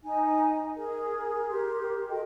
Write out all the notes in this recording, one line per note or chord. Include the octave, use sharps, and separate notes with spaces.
D#4 G#5
G#4 A#4
G4 A#4 C6
F#4 A4 D#5 G5